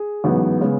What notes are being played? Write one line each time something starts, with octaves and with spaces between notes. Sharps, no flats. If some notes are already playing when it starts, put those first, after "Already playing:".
Already playing: G#4
A1 G#2 F#3 B3
C#3 G#3 B3